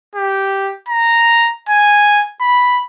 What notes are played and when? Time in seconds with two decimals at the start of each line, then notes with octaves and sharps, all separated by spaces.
0.15 G4
0.88 A#5
1.69 G#5
2.41 B5